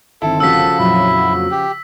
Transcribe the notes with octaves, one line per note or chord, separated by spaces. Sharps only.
G1 D#3 C4 E4 A4
C#3 F3 F#4 E6 B6
F2 A#2 F#3 E4
G4